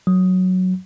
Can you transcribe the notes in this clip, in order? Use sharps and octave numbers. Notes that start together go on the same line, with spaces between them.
F#3